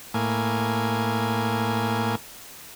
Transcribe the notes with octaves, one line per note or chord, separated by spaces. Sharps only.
A2 A#3 G#5